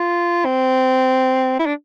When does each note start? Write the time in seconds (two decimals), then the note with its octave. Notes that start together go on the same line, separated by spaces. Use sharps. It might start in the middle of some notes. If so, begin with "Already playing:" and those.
Already playing: F4
0.45 C4
1.59 E4
1.66 D4